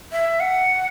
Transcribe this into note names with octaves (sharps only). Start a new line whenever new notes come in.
E5
F#5